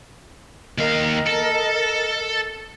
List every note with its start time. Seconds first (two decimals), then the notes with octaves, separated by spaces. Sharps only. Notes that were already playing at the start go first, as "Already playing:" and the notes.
0.78 D#2 A#4 D#5 F5
1.26 A4